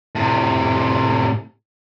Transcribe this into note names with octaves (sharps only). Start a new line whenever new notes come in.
A2 C3